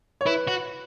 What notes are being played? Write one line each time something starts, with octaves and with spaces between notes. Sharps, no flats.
C#5
E4 B4
F#4